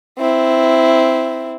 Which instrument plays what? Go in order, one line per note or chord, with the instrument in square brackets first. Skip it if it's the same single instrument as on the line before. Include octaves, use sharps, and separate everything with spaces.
[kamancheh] C4 E4